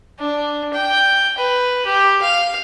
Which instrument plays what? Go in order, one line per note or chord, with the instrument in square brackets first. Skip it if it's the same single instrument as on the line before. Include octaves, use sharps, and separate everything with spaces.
[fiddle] D4
G5
B4
G4
F5